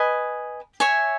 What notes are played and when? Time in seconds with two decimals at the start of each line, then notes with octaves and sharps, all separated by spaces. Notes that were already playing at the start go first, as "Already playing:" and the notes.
Already playing: B4 D#5 G#5
0.80 C#5 E5 G#5